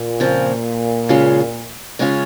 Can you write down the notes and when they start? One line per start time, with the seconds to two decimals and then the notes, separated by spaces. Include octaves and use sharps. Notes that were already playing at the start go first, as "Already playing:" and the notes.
Already playing: A#2
0.20 C#3 F3 C4 F4
1.09 C#3 G#3 C#4 F4
1.99 C#3 G#3 C#4 F4